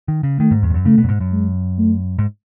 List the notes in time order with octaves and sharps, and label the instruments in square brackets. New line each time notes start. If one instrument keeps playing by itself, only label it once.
[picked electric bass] D#3
C#3
[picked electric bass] D#3 [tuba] A3
[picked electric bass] G#2
E2
G#2
F#2
[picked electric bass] C#3 [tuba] A3
[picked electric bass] B2
F#2
G#2
F#2
[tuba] G#3
A3
[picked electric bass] G#2